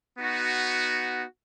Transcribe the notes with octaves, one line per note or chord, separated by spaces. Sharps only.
B3 D#4 F#4